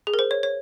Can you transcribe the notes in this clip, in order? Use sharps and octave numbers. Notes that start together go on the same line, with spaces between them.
G#4
A#4
C5
C#5
C#5